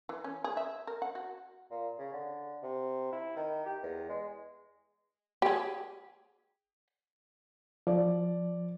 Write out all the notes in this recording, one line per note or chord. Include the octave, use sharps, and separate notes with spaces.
E3
C#4
G#4
E5
A#4
F#5
F#4
A#2
C#3
D3
C3
E4
D#3
G4
E2
G#3
G4 G#4
F3 D5